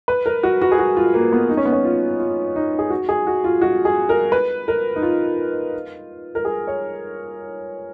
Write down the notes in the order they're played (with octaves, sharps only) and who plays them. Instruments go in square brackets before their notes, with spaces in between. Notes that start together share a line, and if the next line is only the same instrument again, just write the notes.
[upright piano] B4
A#4
F#4
F#4
G#4
F#4
F4
A#3
B3
D#4
C#4
B3
C#4
F4
F4
D#4
G#4
F#4
G#4
F#4
F4
F#4
G#4
A#4
B4
A#4
D#4
F4
A#4
G#4
C#5